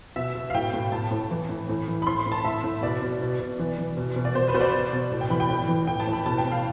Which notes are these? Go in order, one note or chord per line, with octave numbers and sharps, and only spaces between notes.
B2 E5
B2
F5
A2 G5
A2
A2 A5
A2
E3
A2
A2
E3
B5
A2 C6
B5
A2
A5
A2 E5
A2
B2 D5
B2
B2
B2
E3
E3
B2
B2
D5
B2 C5
B4
B2 C5
D5
B2 D5
B2
A2
G5
E3 B5
G5
A2
E3
A2 G5
A5
A2
B5
B2 A5
G5
B2
F5